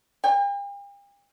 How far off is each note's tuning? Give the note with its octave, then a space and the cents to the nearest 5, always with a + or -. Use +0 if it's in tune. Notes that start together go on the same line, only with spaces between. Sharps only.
G5 +45